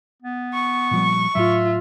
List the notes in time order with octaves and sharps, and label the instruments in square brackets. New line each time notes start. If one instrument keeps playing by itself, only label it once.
[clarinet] B3
[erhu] C#6
[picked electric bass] A#2 F3 G3
[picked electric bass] A2 F#3 [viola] F4 [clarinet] E5